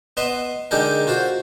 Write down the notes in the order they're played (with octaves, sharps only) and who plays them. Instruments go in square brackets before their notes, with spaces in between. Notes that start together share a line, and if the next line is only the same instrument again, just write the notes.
[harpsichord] B3 D#5 E5 C6
D3 G#3 D#4 G4 A4 A#4
F4 F#4 C5